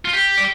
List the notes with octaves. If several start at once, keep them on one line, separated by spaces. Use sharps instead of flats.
F4
G4
D5